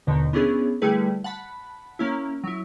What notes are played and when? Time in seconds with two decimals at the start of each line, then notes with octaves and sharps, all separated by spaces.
0.07 D#2 B2 D3 D#3
0.33 B3 C#4 D4 E4 G#4
0.82 D3 G3 A3 E4 G#4 B4
1.24 F#5 A5 B5
1.99 A#3 C#4 E4
2.44 F#3 E4